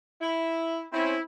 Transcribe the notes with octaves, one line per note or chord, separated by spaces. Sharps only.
E4
C4 C#4 E4